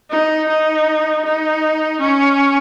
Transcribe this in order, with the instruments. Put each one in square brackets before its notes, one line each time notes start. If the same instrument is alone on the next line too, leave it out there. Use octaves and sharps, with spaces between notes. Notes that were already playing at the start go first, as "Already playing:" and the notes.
[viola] D#4
D#4
D#4
C#4